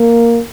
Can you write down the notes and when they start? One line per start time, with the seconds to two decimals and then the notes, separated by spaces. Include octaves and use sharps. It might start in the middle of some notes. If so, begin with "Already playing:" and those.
Already playing: A#3